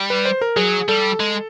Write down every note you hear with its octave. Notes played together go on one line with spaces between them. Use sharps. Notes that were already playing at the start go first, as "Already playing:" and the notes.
Already playing: G3
B4
C5
A#4
F#3 G#4
G3 A4
G#3